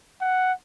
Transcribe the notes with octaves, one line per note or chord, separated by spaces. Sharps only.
F#5